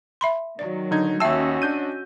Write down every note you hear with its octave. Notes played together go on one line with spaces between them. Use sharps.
E5 B5 C6
D#3 F#3 D5
D3 D#4 G#6
D#2 C#4 F#4 D#5 E5 G5 A5 E6
D4 G6 D#7